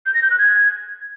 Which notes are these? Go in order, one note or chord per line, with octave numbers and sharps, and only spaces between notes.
G6
A#6
G6
F#6
G#6